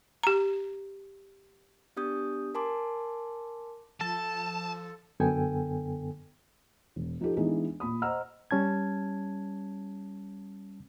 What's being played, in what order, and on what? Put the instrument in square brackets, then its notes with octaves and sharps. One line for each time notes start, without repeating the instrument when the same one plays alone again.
[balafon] G4 A#5
[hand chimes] B3 D4 G4 D#6 G6
A#4 G#5 A5 C6 D6
[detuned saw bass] F3 [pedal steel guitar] A4 [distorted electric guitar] A5
[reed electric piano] F#2 D3 B3 A4 G5 G#5
[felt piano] E1
F3 D#4 F4 G4 A4
E3 G#3 B3 D4 D#4 G#4
A#2 B5 D#6
C5 D#5 F#5 A#5 E6 F6
[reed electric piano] G3 C#4 A5 G#6